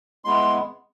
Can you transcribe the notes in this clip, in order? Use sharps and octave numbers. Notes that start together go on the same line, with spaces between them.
G#3 B3 E4 C6